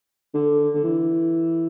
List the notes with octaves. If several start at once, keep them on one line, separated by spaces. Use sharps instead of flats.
D3
D3
E3